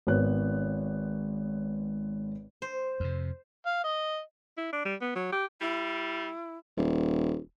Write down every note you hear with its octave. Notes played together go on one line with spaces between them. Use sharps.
G#1 G#2 B3 B4 C#5 F#6
C5
F2 C3
F5
D#5
E4
D4
G3
B3
F#3
G4
G3 E4
D#1